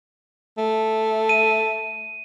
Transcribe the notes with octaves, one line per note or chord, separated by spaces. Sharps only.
A3
D#7